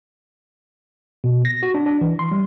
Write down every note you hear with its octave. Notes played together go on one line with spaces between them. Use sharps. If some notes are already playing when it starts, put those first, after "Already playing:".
B2
A#6
F#4
D4
D4
E3
C6
G3